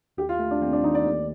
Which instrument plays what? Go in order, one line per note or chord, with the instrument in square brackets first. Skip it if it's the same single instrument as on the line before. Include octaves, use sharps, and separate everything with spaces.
[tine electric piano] D#2 [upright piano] G4
[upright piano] F4
[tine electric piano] A3
[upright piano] D4
[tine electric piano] D#2 [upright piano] C4
[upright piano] D4
[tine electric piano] D#3 [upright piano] D#4
[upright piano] D5
[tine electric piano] D#2